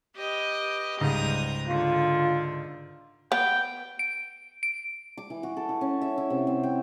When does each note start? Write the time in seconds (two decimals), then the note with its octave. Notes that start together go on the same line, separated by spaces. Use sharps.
0.17 G4 B4 D#5
1.01 C#2 G#2 G3 A#5 D#6
1.69 D3 F4
3.32 B3 G5
3.99 D7
4.63 D7
5.17 D6
5.30 E3
5.43 F#4
5.57 A4
5.69 E4
5.81 C#4
6.01 E5
6.18 E4
6.30 C3
6.47 C4
6.63 G5